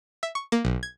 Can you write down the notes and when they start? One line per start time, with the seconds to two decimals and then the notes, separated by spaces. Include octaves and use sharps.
0.23 E5
0.35 C#6
0.52 A#3
0.65 B1
0.83 G#6